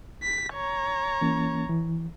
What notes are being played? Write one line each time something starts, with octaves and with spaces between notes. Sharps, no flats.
B6
C#5 A#5
E3 A#3 C#4
E3